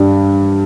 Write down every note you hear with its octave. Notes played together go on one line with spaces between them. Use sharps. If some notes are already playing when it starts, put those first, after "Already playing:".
Already playing: G2 G3